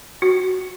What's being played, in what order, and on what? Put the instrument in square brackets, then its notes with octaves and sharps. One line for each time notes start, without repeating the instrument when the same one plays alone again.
[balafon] F#4